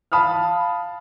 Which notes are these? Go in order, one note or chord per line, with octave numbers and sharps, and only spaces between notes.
F5 A5 B5 D#6 F6